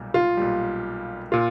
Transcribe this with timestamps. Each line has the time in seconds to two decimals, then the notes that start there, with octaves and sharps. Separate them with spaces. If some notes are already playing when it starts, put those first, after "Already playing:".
Already playing: B1 A#2 G3
0.14 F4
0.37 B1 A#2 G3
1.32 A#2 F4